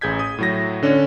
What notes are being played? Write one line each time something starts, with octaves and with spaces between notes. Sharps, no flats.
A1 G#4 G6 G#6 B6
D#6
A2 F#3 A#6
D3 C#4 D4 C#5 D5